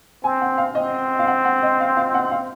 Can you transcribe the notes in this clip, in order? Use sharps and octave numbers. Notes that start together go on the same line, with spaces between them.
C4 G#5
F#5
F5
C4 D#5
F5
F#5
F#5
D#5
F5
F5
F#5
F5